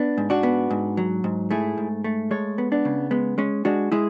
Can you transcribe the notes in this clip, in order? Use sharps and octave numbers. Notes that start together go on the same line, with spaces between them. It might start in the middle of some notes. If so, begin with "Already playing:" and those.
Already playing: B3 D4
G#2
D4 F#4
B3
G#2
F#3
G#2
A3 E4 G#4
G#2
A3
G#3 A4 C#5
B3
B3 D4
C#3
G#3 B3
G#3 C#4
G#3 D4 F#4
G#3 E4 G#4